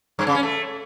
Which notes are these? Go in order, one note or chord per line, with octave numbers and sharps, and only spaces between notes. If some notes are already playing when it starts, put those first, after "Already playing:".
G2
C#3
C#4
A3